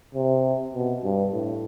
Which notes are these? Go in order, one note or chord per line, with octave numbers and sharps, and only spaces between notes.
C3
B2
G2
A2